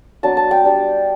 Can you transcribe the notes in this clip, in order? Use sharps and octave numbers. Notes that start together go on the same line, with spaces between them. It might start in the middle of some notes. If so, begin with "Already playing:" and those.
F#3 B3 D4 A5
A5
G5
G3 D4